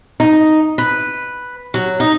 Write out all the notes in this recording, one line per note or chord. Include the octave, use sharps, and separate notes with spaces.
D#4
B4
F#3
D#4